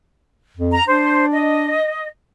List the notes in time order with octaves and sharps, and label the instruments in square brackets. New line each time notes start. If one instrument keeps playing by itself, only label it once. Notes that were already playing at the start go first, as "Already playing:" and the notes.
[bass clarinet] F2
[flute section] A#5
[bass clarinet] D4 [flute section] C5
[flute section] D#5